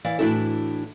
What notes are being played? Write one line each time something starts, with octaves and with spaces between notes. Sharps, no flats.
E3 D5 F5
A2 E3 D4 E4 F#4 A4